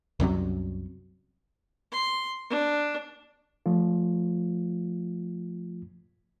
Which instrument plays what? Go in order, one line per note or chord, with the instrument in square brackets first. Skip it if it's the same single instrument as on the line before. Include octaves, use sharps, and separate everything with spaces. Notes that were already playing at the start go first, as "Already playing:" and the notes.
[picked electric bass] C2 F#2 C3 F#3
[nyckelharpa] C6
D4
[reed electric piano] F3 A3 F4